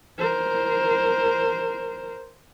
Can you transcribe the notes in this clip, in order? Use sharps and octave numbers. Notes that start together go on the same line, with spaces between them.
A#4 C5